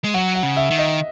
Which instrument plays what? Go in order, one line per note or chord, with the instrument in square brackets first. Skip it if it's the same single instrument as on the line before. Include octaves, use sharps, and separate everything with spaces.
[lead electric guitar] G#3
[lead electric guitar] F#3 [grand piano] F#5
[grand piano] F#5
[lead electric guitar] C#3
[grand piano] E5
[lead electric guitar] D#3
[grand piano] D#5